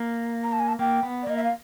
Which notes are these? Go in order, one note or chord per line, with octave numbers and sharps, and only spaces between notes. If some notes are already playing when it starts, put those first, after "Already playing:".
Already playing: A#3
A#5
A5
G#5
A5
A#3 G5
B3
D5
A#3 D#5
E5
F5